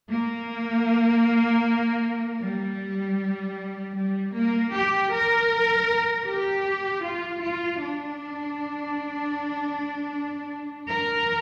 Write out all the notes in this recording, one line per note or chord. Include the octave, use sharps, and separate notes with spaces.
A#3
G3
G3
A#3
G4
A#4
G4
F4
F4
D4
A#4